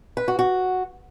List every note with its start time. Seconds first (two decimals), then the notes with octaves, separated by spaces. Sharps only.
0.17 B4
0.28 F#4
0.39 F#4